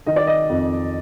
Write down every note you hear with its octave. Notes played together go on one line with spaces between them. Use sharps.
D#3 D#5
D5
D#5
F2